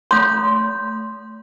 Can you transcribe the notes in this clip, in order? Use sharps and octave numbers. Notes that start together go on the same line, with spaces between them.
A3 C6 G6